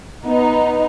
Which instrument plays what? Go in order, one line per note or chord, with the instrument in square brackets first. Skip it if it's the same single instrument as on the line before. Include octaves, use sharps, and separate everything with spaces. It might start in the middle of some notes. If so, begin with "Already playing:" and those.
[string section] B3 D#4